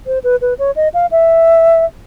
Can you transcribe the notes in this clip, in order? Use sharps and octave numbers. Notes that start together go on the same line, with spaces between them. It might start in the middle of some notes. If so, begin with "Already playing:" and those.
C5
B4
B4
C#5
D#5
F5
E5